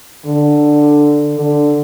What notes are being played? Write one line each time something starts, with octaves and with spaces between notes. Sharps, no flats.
D3
D3